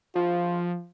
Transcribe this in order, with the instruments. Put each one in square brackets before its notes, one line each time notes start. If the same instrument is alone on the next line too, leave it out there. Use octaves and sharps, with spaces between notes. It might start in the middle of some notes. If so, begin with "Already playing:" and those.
[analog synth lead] F3 [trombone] F4